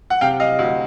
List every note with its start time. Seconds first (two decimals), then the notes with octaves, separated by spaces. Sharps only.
0.10 F#5
0.21 C3 F5 G5
0.40 D#5 F5
0.59 D2